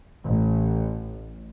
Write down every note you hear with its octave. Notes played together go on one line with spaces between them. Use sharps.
A1